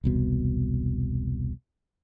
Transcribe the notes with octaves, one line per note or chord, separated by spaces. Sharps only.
E1 C2 B2